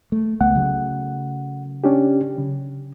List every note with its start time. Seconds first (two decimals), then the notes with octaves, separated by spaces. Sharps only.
0.12 A3
0.41 C#2 A3 B3 F#5
0.55 C#3 F#3 A3
1.84 C#4 D4 G4
2.38 C#3